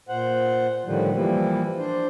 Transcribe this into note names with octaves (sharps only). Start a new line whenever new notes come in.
A#2 C5 F#5
A2 D3 D#3 F3 G3
E3 F3 G3 A#3
D4 C5